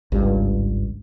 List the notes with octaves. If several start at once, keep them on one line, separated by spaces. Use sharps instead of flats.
G#1 C#2 G2